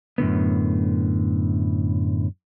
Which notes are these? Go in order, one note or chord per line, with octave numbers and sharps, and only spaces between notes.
F#2 A2 D3 B3